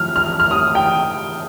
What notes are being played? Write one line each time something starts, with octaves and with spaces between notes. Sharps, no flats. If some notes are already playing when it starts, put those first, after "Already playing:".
Already playing: F3 F6
F6
F6
D#6
G5